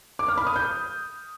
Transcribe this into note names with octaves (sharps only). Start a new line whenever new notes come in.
D6
F6
B5
D#6
G6